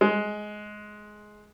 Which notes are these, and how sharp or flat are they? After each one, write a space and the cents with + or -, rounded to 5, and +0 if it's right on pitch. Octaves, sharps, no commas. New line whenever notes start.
G#3 +15